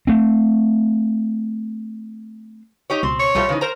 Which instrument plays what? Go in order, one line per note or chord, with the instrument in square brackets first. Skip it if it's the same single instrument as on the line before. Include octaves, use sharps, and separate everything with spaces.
[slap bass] A3 C4
[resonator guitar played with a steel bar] D#4 G4 C#5
[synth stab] C#2 B2 C6 [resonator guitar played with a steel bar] C4
[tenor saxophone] C#5
[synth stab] C2 F4 C5 [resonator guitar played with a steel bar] B2 G3 A3
[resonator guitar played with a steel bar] C#3 E3 D#4
[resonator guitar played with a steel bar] A#4 C5 A#5 [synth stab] A#6